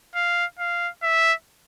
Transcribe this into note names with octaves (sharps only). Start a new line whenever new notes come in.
F5
F5
E5